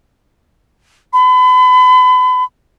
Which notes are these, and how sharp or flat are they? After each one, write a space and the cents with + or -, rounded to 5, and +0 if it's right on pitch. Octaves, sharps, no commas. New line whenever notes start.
B5 +35